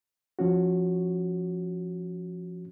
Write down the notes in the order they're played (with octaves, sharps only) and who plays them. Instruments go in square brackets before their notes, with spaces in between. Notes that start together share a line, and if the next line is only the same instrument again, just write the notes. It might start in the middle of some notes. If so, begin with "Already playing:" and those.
[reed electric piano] F3 C#4 F#4